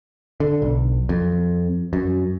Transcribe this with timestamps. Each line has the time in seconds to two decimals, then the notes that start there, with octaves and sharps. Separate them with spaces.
0.40 D3
0.62 B1
1.09 F2
1.93 F#2